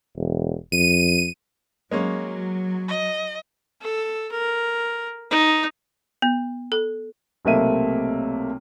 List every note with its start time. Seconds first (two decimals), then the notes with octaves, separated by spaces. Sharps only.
0.16 E1
0.72 F2 D#7
1.91 F#3 G#3 A#3 C#4
2.88 D#5
3.82 A4
4.32 A#4
5.31 D#4
6.22 B3
6.72 A4
7.45 B1 C3 A3 A#3 E5 D#7